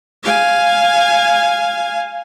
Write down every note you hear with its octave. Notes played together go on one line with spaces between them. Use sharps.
F5 G#5